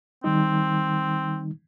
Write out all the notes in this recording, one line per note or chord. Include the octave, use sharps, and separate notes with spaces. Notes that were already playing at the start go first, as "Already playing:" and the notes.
D#3 G3 C4 D#4